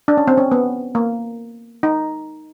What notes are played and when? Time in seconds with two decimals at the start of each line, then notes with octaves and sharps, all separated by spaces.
0.08 D4
0.17 C#4
0.28 C4
0.37 C#4
0.52 B3
0.95 A#3
1.83 D#4